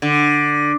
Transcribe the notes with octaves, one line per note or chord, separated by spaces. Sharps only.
D3